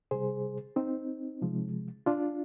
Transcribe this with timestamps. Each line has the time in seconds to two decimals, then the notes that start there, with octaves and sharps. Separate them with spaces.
0.11 C3 G3 G#4 C5
0.76 C4 D#4
1.42 C3 F3 G#3
2.06 D4 F4